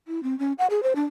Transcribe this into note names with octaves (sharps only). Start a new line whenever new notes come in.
E4
C4
C#4
F#5
G#4
C5
D4